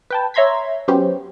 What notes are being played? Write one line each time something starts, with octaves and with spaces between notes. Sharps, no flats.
B4 G5 A5
C#5 E5 A#5 C6 G#6 B6
F#3 B3 C#4 G4 C5